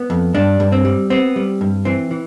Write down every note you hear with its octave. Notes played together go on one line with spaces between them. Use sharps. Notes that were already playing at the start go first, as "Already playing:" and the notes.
Already playing: B3
F2
G2 D4
G2
C4
G3
B3 C4
G3
G2
E3 C4
E3